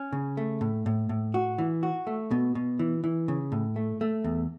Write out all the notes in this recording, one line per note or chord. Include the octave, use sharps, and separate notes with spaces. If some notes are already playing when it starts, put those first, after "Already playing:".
Already playing: C#4
C#3
A3
A2
A2
A2
F#4
E3
F#4
A3
B2
B2
E3
E3
C#3
A2
A3
A3
E2